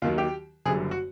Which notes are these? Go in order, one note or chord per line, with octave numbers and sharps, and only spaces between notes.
D#2 D#3 F#3 F4
G4
F#1 F#2 D3 G3 G#4
F#4